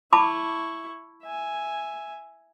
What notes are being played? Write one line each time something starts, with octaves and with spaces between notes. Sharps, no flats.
E4 A5 B5 C#6 D6
E5 G#5